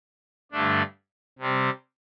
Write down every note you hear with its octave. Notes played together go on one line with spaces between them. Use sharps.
G2 D3 A3 D4
C3 G3 C4